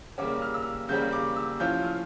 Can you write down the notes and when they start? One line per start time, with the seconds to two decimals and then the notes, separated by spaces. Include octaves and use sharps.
0.18 C#3 G3 A#3 C#4 D6
0.42 F6
0.54 E6
0.88 C#3 G3 A#3 C#4 G6
1.13 D6
1.36 E6
1.59 A2 F3 C#4 F4 G6
1.84 F6